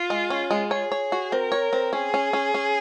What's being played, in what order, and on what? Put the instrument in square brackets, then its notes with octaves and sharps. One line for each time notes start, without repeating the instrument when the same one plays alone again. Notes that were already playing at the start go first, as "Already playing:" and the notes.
Already playing: [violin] F4
[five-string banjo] G#3
C#4
G#3
[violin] G#4 [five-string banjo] C#5
[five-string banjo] C#5
F#4
[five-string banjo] C4 [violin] A#4
[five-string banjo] C#5
C4
[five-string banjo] C#4 [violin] G#4
[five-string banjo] C#4
C#4
C#4